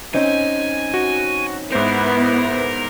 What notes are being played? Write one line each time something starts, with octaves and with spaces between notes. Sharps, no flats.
C4 C#4 D#4 G#5
F#4
G#2 B3 E4 A#4 C5